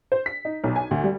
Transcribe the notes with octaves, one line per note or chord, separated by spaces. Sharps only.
C5
B6
D#4
B1
G#5
D2
G3